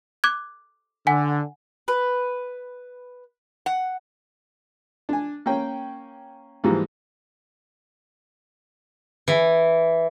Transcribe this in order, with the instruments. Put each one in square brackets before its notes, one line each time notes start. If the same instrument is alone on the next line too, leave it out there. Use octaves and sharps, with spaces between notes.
[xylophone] D6 F#6 G#6
[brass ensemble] D3 [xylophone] F#5 G#5
[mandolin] B4
[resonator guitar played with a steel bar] F#5
[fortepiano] D4 G#5
A#3 C#4 G5
G#2 E3 F3 G3 A#3
[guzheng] E3